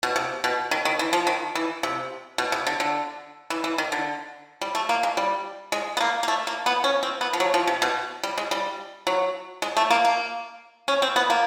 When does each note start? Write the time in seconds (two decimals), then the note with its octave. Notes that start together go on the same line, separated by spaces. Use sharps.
0.03 B2
0.16 C3
0.44 B2
0.71 D#3
0.85 D#3
0.99 E3
1.13 F3
1.27 D#3
1.55 E3
1.83 C3
2.38 B2
2.52 C3
2.67 D3
2.80 D3
3.50 E3
3.64 E3
3.78 D#3
3.92 D3
4.61 G3
4.75 A3
4.89 A#3
5.03 G#3
5.17 G3
5.72 G#3
5.97 B3
6.01 A#3
6.23 A#3
6.28 A3
6.47 A#3
6.66 B3
6.84 C#4
7.03 C4
7.21 B3
7.33 F3
7.40 F#3
7.54 F3
7.67 C3
7.82 B2
8.23 G3
8.38 G#3
8.51 G3
9.07 F#3
9.62 G#3
9.77 A3
9.90 A#3
10.05 A#3
10.88 C#4
11.02 C4
11.16 B3
11.30 A#3